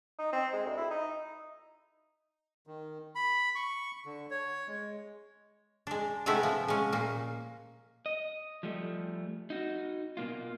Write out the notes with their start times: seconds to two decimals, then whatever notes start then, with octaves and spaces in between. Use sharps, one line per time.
0.19 D#4
0.33 C4
0.53 G#3
0.66 D2
0.77 E4
0.91 D#4
2.67 D#3
3.15 B5
3.55 C#6
4.06 D3
4.31 C#5
4.68 G#3
5.87 G#3 D4
6.26 C3 G#3 A3 B3 E4
6.43 F3
6.68 G#3 C#4
6.92 A#2 A#3
8.06 D#5
8.63 F3 G3 A3
9.50 D#4 F#4
10.17 B2 A#3 F4